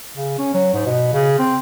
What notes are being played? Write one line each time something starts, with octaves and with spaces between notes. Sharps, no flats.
C#3
C#4
F#3
G#2
B2
C#3
C4